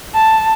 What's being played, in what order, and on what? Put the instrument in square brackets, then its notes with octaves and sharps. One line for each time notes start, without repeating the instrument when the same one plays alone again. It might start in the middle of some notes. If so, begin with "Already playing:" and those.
[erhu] A5